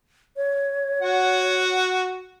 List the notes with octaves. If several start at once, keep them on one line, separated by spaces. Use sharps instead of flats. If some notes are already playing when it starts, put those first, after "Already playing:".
C#5
F#4 F#5